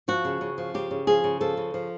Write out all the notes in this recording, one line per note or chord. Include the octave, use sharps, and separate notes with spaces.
F3 F#4
C#3
C#3
F3
C#3 G4
C#3
F3 G#4
C#3
F3 A4
C#3
F3